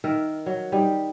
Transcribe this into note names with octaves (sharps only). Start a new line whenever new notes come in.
D#3 A#4 E5
F#3
G3 D#4 G4